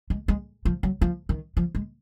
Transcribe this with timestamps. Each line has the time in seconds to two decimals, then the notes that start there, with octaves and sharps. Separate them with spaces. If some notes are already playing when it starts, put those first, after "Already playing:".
0.10 G#3
0.28 G#3
0.65 F3
0.83 F#3
1.02 F3
1.29 D#3
1.57 F3
1.75 G#3